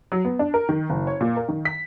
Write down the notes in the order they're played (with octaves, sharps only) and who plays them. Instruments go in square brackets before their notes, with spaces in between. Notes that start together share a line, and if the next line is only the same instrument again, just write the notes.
[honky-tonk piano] F#3
B3
D4
A#4
D#3
F#1
C#5
A#2
A#4
D#3
B6